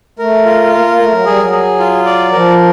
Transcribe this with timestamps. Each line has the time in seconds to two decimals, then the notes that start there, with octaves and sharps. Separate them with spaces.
0.19 A3 A#4
0.46 F4
0.72 A#3 A#4
0.86 A#3
0.99 A3 A#4
1.12 F#3
1.26 G3 G#4
1.39 F#3
1.52 G#4
1.80 F4
2.06 D5
2.32 F3 A#4